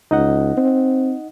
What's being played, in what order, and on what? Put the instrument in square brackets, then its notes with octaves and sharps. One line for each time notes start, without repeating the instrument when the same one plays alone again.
[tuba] C#2 [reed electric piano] D#4 D#5 F#5
[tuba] C4